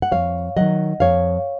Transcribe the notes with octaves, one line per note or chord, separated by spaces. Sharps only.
F#5
F2 C#5 F5
D#3 F#3 D#5 F#5
F2 C#5 F5